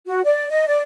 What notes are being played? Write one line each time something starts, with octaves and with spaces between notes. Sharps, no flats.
F#4
D5
D#5
D5